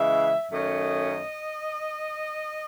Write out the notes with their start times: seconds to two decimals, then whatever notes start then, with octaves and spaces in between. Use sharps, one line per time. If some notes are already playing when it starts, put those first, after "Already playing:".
Already playing: C#3 E3 G#3 E5
0.51 F#2 D#3 A3 C#4 D#5